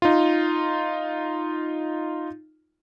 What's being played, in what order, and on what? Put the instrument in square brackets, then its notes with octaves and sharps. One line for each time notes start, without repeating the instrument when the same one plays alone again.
[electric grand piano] D#4 F4